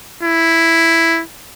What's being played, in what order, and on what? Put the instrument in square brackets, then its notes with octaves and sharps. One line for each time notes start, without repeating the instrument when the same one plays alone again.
[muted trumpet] E4